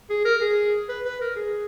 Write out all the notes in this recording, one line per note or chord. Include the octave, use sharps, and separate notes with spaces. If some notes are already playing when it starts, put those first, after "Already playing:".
G#4
A#4
G#4
B4
B4
A#4
G#4